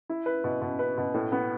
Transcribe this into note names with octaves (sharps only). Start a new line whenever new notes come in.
E4
B4
B2
B2
B4
B2
A2
B3